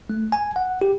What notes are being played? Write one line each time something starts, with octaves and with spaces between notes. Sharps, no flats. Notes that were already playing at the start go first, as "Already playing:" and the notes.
A3
G#5
F#5
G4